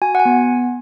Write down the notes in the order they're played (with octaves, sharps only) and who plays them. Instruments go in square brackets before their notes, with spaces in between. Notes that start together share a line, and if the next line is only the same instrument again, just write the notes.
[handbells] F#4 G#5
F#5
G#5
B3